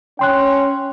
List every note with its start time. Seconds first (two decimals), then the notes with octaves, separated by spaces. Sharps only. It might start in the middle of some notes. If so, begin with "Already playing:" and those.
0.19 C#4 G5 C6 F#6